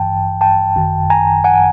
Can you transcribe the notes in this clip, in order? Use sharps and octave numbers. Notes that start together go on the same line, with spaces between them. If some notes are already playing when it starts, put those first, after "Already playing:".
Already playing: A1 G2 E3 G5 A5
G5 A5
G#1 F#2 D#3
G#5 A#5
F#5 G#5